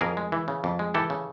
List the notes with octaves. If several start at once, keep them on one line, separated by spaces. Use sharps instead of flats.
F2 G#4 A#4
G#3
E3
C#3
F2
G#3
E3 G4 A4
C#3